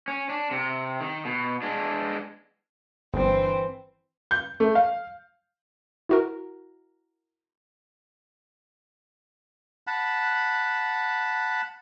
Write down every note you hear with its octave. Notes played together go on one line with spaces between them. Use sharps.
C#4
D4
C3
D#3
B2
G#3 D4
G1 G2 E3 C4 C5
G6
A3
F5
E4 F#4 A#4
F#5 A5 B5